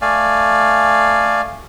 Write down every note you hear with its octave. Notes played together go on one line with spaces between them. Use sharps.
A3 D5 F5 G#5